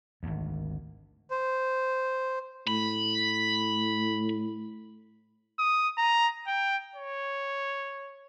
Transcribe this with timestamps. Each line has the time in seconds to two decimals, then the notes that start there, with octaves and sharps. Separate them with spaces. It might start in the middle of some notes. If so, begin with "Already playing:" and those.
0.23 G#1 D2
1.31 C5
2.68 A2 B5
5.59 D#6
5.98 A#5
6.47 G5
6.95 C#5